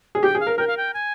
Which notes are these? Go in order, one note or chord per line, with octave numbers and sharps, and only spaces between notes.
G#4
G4 G5
G#4
F5
A#4
A#4 G5
F5
G5
G#5